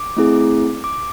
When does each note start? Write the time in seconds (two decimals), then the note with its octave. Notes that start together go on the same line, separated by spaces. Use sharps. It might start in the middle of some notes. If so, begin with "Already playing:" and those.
Already playing: D6
0.17 A3 C4 E4 G#4
0.84 D6